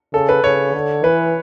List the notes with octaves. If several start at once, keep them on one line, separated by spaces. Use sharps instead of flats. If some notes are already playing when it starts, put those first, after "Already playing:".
C#3 A4
B4
C#3 C#5
D3
E3 B4